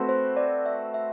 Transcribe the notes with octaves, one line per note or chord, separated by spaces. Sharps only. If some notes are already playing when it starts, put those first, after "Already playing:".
Already playing: A3 C4 F#4 B4
C5
D5
E5
E5